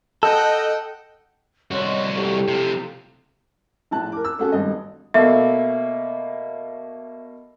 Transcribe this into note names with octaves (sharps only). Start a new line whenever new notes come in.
A4 D#5 F#5 G5 G6
C2 F#4 C#5 D#5 C6
E4 G4 A4
C3 F3
A#1 A2 A5 F#6
A#4 D6
E6
A3 C4 C#4 F#4 G#4 A4
G#1 G2 D#5
B2 A3 A#3 E5